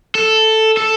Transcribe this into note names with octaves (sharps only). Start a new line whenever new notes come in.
A4
A4